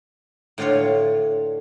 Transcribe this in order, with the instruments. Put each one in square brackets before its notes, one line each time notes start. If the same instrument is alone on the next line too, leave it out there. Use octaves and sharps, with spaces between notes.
[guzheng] A2 D3 D4 F4 C#5